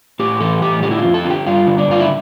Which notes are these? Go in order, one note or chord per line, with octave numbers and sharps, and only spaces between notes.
A2 G4
E3 A4
A2 G4
D3 G4
E4
F4
F2
A4
D3 F4
G4
G2 F4
D3
D4
G2 F4
E4